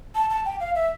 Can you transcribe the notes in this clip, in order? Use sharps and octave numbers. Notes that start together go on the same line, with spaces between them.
A5
A5
G5
F5
E5